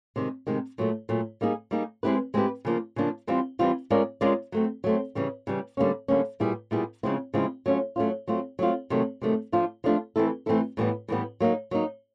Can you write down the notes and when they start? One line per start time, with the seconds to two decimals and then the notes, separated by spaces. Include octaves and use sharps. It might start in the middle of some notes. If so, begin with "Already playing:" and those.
0.16 C3 D#3 G#3
0.47 C3 D#3 G#3
0.78 A#2 F#3 A3
1.09 A#2 F#3 A3
1.41 G3 A#3 D#4 G#4
1.71 G3 A#3 D#4 G#4
2.03 G#3 C4 E4 G4 B4
2.34 G#3 C4 E4 G4 B4
2.65 C#3 F3 A#3 D4
2.96 C#3 F3 A#3 D4
3.27 E3 G3 C4 F4
3.59 E3 G3 C4 F4
3.90 G#3 C#4 F4 A#4 D5
4.21 G#3 C#4 F4 A#4 D5
4.52 F#3 A3 C4
4.84 F#3 A3 C4
5.15 C#3 E3 G3
5.47 C#3 E3 G3
5.77 D3 G3 A#3 C#4
6.08 D3 G3 A#3 C#4
6.40 A#2 G3 B3 E4 G#4
6.71 A#2 G3 B3 E4 G#4
7.03 C#3 F3 G#3 C4 E4
7.34 C#3 F3 G#3 C4 E4
7.66 F#3 A3 C#4 F4
7.96 F#3 A3 C#4 F4
8.28 F#3 A3 C4 F4
8.59 F#3 A3 C4 F4
8.90 C3 D#3 F#3 A3
9.22 C3 D#3 F#3 A3
9.52 F3 A3 D4 F4
9.84 F3 A3 D4 F4
10.16 E3 A3 C4 E4 A4
10.46 E3 A3 C4 E4 A4
10.77 A2 E3 G3 B3
11.08 A2 E3 G3 B3
11.40 F#3 A#3 D#4
11.71 F#3 A#3 D#4